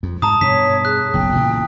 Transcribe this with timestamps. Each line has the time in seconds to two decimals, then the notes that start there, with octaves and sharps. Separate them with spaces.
0.03 F2
0.22 G#2 A5 A#5 D#6
0.41 G2 B2 C#5 B6
0.85 G#4 F#6
1.14 F#1 B1 G5
1.35 A#2 C#3 E3